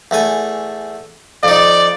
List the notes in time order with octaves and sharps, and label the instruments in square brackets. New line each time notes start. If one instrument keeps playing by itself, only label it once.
[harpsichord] E2 A3 G#5
[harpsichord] F2 D#4 [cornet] D5